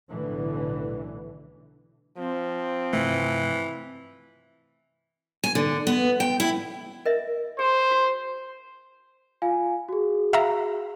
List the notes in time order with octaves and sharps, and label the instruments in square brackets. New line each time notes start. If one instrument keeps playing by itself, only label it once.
[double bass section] B1 A2 D3 E3
[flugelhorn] F3 [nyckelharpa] C4
[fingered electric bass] G2 C3 A3 [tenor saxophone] E3
[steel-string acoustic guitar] G#5
D3
B3
G5
E4
[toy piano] A#4 D#5 E5
[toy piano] G#4 [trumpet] C5
[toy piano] F#4
[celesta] F4 F5 G#5
F#4 G#4
[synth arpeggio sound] E5 F5 A#5